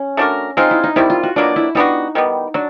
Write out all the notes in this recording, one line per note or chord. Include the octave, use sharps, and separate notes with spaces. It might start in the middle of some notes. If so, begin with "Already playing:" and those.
Already playing: C#4
A3 D4 F#4 A#4
G#3 C4 D#4 F4
E4
D#4
C3 D#3 G3 E4
F4
F#4
B2 F#3 A#3 D4 F4
E4
G3 B3 D4 D#4 F#4
D#3 G3 B3
F#3 D4